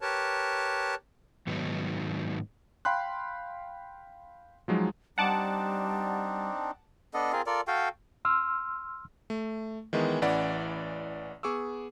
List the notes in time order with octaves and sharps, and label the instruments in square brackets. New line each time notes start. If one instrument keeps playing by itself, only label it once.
[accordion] G4 A#4 B4 C#5 A5
[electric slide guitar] G#2 D#3 F#3 B3 D#4
[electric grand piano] F5 G5 B5 C6 F#6
F3 F#3 G#3 D#4
[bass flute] G3 [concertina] C4 D4 D#4 [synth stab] F#5 A5 D6
[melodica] B3 D4 A4 D#5
C4 F4 G#4 A#4
F4 A4 A#4 D5
F#4 A4 F5 G5
[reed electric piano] C6 E6 F6
[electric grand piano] A3
D#3 E3 G#3 B3 B4
A1 E3 C#4 D5 F#5 B5
B3 G#4 C#6 D6 E6